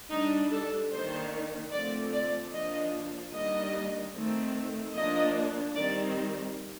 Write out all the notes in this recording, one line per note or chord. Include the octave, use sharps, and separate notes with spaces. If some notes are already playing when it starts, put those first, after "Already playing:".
G3 D4 D#4
A4
D#3 A#3 D4 C5
D3 F3 A3 C4 D5
D5
F3 A#3 D4 D#5
D#3 G3 A#3 D4 D#5
D#3 A3 C4
F3 A#3 D4 D#5
D#3 G3 C4 D5